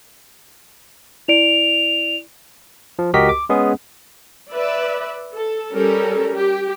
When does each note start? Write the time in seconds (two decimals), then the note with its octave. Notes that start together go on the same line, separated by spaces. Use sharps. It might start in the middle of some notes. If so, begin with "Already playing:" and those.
1.28 E4 D5 D7 F7
2.99 F3
3.14 C#2 F#4 G4 A#4 D#5 B6
3.29 D6
3.49 G#3 B3 C#4 G#4
4.52 B4 D5 E5
5.35 A4
5.73 G3 C#4 A4 A#4
6.35 G4